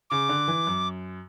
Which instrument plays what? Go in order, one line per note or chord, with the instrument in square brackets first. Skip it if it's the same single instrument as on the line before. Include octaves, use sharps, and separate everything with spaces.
[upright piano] C#3 [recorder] D6
[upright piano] D3
E3
F#2